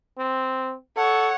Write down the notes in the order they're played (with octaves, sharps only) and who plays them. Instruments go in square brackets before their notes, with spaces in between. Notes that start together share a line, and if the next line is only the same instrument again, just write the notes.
[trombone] C4
[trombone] A4 [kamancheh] C#5 F#5